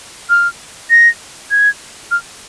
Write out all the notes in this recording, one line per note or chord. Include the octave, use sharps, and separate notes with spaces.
F6
A#6
G#6
F6